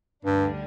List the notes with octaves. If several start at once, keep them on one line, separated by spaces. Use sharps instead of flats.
D2 G2 D3 G3 D4